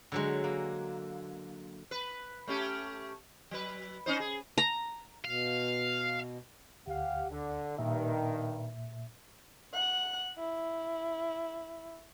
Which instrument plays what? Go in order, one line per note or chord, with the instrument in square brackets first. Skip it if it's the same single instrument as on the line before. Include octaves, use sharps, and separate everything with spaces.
[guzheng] D3 F#3 G#3
A#3
[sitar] B4
A3 C#4 G4
F#3 B4
C#4 D#4 C5
G#4
[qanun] A#5
[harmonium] B2 [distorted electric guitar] F5
[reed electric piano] D2 [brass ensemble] G4 F5 F#5
[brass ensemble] D3
[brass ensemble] G2 D#3 [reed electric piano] A#2 E5
[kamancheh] F#5 F#6
E4